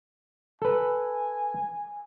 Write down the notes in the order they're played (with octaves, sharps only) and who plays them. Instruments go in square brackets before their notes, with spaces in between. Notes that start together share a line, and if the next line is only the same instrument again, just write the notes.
[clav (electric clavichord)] A4 B4 [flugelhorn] G#5